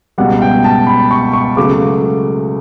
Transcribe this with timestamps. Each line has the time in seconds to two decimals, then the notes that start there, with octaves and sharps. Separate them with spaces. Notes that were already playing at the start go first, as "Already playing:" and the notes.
0.18 C#2 B2 G3 F#5
0.42 G5
0.64 A5
0.87 B5
1.11 C#6
1.33 C#6
1.57 C#2 C#3 F#3 A3 D6